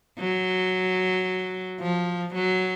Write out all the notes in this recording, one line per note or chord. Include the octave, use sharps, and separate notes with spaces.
F#3
F3
F#3